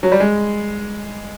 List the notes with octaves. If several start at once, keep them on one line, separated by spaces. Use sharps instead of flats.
F#3
G3
G#3